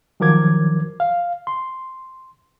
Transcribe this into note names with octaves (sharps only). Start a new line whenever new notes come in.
D#3 F3 F#3 A#4 D6 G#6
F5
C6